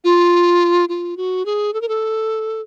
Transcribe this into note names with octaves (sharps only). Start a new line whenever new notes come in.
F4
F4
F#4
G#4
A4
A#4
A4